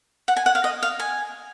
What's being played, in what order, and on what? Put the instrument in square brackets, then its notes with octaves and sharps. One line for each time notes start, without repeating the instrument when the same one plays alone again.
[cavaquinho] F#5
G#5
F#5
F5
D#5
F5
G#5